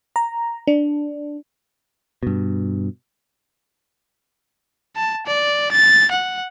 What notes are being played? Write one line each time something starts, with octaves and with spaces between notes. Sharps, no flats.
A#5
D4
G2 B2
A5
D5
A6
F#5